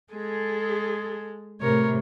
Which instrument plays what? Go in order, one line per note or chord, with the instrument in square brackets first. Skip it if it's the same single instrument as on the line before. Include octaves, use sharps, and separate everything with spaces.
[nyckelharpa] G#3 [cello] G#4 A4
[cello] A2 C3 [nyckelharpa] A#4 C#5